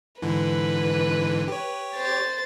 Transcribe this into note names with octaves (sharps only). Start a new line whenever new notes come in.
G#2 D3 E3 B4
G4 C#5
C5 A6